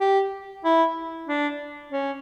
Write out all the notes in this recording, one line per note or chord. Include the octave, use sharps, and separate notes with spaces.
G4
E4
D4
C#4